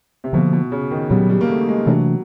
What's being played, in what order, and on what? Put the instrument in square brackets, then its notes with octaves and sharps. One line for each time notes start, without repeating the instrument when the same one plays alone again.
[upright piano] C3
[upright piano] B2 [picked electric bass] D3 F3 A#3
[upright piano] B2
C#3
D#3
[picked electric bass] A#2 F#3 B3 [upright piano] G3
[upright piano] G3
A#3
A3
G#3
[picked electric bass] C3 E3 A3 D4 [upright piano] F#3